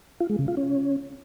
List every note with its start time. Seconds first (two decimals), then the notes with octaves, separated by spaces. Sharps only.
0.20 F4
0.30 G#3
0.39 C#3
0.48 F4
0.57 C#4